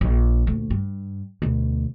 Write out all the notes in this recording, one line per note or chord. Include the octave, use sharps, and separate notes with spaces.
A#1
D2 A#2
G2
D2 B2